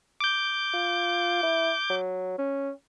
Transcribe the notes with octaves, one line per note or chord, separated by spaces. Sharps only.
D6 G6
F4
E4
F#3
C#4